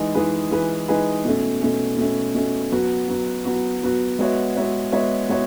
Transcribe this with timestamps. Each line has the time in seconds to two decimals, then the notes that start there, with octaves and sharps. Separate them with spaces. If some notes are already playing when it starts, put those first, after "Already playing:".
Already playing: E3 G#3 D#4 G#4 B4
0.14 E3 G#3 D#4 G#4 B4
0.51 E3 G#3 D#4 G#4 B4
0.88 E3 G#3 D#4 G#4 B4
1.25 B2 A3 C#4
1.61 B2 A3 C#4
1.98 B2 A3 C#4
2.35 B2 A3 C#4
2.72 F#3 B3 F#4
3.08 F#3 B3 F#4
3.45 F#3 B3 F#4
3.82 F#3 B3 F#4
4.19 G#3 B3 F#4 C#5 E5
4.56 G#3 B3 F#4 C#5 E5
4.92 G#3 B3 F#4 C#5 E5
5.29 G#3 B3 F#4 C#5 E5